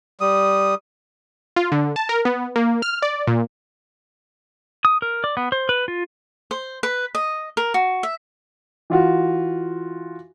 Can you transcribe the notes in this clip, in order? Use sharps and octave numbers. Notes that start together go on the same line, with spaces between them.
G3 D#6
F4
D3
A5
A#4
B3
A#3
F6
D5
A#2
D#6
A#4
D5
B3
C5
B4
F4
C5
B4
D#5
A#4
F#4
E5
E3 F4 F#4